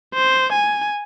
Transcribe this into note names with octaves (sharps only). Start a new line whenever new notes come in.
C5
G#5